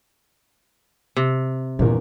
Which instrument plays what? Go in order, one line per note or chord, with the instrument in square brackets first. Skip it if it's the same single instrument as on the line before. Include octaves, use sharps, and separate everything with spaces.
[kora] C3
[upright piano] G1 E2 A#4 [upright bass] A#2 D3